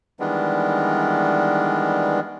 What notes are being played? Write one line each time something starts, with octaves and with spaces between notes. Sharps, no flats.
D#3 E3 G3 G#3 B3 D4